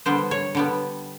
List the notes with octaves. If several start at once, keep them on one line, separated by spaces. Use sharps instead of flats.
D3 G3 B3 C5
C#5
D3 G3 B3